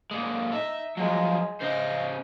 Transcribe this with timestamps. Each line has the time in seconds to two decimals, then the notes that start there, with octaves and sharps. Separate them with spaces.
0.11 A#2 G#3
0.52 D#4 E5
0.98 F3 F#3 G#3
1.61 C#3 C5 D#5